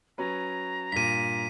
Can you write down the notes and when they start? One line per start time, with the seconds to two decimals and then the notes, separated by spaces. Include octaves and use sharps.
0.18 F#3 C#4 B4 A#5
0.92 G2 A#2 B6 D#7